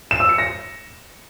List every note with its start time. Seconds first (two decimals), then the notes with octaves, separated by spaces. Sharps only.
0.11 E7
0.20 E6
0.29 C#7
0.38 A#6